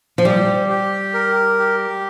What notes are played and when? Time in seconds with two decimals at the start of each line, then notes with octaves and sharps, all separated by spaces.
0.18 F3
0.25 G3 G4
0.69 G4
1.14 A#4
1.59 G4